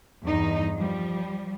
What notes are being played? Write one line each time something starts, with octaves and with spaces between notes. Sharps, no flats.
E2 G2 D#4
F3 G3